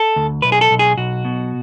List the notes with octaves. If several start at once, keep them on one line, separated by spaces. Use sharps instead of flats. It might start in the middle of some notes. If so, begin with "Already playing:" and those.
Already playing: A4
D2
B1 B4
G#4
A4
B1
G#4
B1 F#4
B2